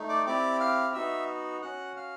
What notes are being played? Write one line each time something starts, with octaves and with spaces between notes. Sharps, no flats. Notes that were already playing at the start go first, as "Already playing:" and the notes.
Already playing: A3 D#4
D5 D6
C4 E4 G4 D5 D6
F5 F6
B3 D#4 F#4 E5 E6
C#4 F#4 F#5 F#6
F5 F6